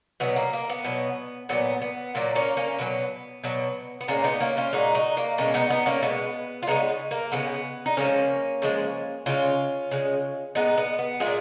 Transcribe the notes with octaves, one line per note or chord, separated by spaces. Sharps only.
B2 F#3 B3
A#3
A#3
B3
B2 F#3
A#2 F#3 B3
B3
A#2 F#3 A#3
A#3 C#4
A#3 C#4
B2 F#3 B3
B2 F#3
B3
A#2 G#3 A#3 C#4
B3 D#4
A#3 C#4
C#4 F4
A#2 G#3 D#4 F#4
D#4 F#4
A#3
B2 G#3 A#3 C#4
B3 D#4
B3 D#4
A#3 C#4
B2 G#3 B3
F4
C#3 F3 G#3 B3 D#4
A#3
C#3 F3 G#3 B3
D#4
C#3 F3 G#3 A#3 C#4
C#3 F3 G#3
C#3 G#3 C#4 F4
C#3 G#3
A#2 G#3 B3 D#4
B3
B3
A#2 G#3 F4 G#4